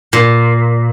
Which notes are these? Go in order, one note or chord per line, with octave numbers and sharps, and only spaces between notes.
A#2